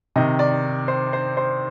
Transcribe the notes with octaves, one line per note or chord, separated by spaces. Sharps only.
C3 D#3 D#5
D5
C5
C5
C5